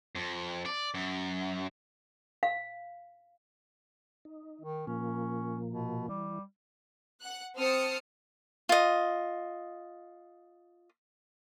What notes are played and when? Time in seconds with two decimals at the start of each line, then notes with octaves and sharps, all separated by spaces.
0.15 F2
0.66 D5
0.94 F#2
2.43 F5
4.25 D#4
4.61 D#3
4.87 A#2 F3 A#3 C#4
5.67 B2
6.09 E3 G3
7.21 F#5 F#6
7.58 C4 C5 A5 D#6 F6 C#7
8.69 F4 D#5